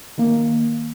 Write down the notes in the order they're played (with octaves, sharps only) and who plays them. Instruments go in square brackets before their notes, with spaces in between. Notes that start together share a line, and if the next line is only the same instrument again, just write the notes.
[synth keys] D#3 A#3